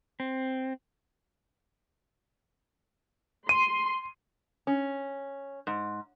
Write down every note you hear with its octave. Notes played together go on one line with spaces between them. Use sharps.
C4
C6 D#7
C#4
G#2